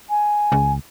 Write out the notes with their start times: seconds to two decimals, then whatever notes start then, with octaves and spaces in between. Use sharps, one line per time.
0.10 G#5
0.52 C#2